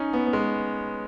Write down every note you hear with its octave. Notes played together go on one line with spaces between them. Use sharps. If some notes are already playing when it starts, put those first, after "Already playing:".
Already playing: C#4 D#4
B3
B3
G#3